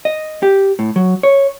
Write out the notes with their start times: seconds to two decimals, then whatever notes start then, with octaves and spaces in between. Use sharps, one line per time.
0.05 D#5
0.43 G4
0.79 A2
0.96 F#3
1.23 C#5